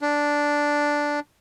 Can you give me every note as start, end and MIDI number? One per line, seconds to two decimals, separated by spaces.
0.01 1.20 62